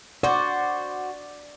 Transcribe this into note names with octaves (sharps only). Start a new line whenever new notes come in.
F#4 C5 D5